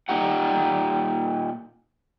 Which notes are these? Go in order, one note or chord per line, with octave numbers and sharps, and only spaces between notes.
A#2 D#4 G4 F#5